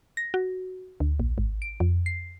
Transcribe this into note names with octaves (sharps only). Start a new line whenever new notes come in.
A#6
F#4
D2
A#1
G#1
D7
F2
C7